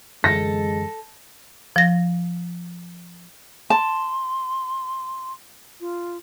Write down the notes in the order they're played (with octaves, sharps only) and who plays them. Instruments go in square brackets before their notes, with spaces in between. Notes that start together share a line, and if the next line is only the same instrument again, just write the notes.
[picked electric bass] F#2 D3 E3 [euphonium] G#3 [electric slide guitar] A4 [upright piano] A#6
[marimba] F3 A#6
[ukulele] A5 [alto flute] C6
[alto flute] F4